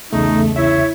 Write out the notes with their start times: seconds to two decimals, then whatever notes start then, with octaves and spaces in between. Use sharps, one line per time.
0.13 B1 E2 C#3 A3 D#4
0.56 E4 C#5 E5